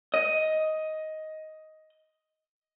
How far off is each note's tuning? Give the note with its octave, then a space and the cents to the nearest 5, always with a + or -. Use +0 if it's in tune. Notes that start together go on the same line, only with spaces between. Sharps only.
D#5 +10